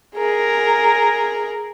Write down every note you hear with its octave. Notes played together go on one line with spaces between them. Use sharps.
G#4 A#4